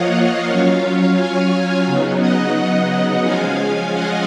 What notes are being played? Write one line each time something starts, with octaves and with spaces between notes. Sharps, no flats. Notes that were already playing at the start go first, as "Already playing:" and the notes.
Already playing: F3 A#3 F4 C#5 D#5 F5 F#5
F#3 C#4 F4 C#5 F5
F5 G#5
C#3 F#3 B3 D#4
D#5 F#5
F3 G#3 C#4 F4 F5 G#5
D#5 F#5